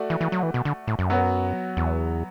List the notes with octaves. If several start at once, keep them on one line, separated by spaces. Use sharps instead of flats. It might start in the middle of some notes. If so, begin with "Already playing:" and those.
Already playing: A3 F#4 D5
E3
E3
F#3
E3
B2
D3
A2
F#2
F#3 B3 F#4
E2